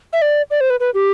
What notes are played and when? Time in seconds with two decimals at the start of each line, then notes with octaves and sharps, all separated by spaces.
0.13 E5
0.22 D5
0.51 D5
0.61 C5
0.70 B4
0.80 B4
0.94 G4